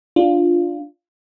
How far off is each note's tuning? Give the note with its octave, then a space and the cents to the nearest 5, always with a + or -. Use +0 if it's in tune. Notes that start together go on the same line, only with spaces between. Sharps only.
D4 +0 F4 +0